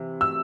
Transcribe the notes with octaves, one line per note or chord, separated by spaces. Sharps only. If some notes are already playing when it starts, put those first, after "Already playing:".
Already playing: C3 E3
E6